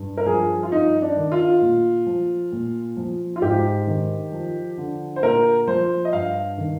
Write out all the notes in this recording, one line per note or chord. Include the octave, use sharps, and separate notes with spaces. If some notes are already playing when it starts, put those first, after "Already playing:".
Already playing: G2
A#4
F3 G#4
F4
G2 D#4
D4
D#3
F4
A#2
F3
A#2
F3
F4
G#2 G4
D#3
F3
D3
C5
A#2 A#4
F3 C5
D#5
G2 F5
D#3